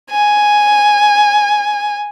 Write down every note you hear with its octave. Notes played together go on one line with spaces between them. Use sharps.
G#5